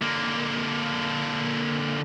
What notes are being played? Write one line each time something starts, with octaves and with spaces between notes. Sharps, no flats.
D3 A#3